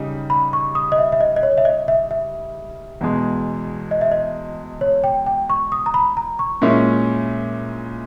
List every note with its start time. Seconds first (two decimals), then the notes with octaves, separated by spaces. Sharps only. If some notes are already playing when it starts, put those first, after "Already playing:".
Already playing: C#3 G3 D#4
0.30 B5
0.53 C#6
0.75 D#6
0.92 D#5
0.98 E5
1.12 E5
1.20 D#5
1.36 D#5
1.43 C#5
1.58 E5
1.65 D#5
1.88 E5
2.11 E5
3.01 E2 B2 G#3
3.91 D#5
4.01 E5
4.11 D#5
4.81 C#5
5.04 G5
5.26 G5
5.50 C#6
5.72 D#6
5.86 A#5
5.94 B5
6.17 A#5
6.39 C#6
6.62 A#2 G#3 C#4 E4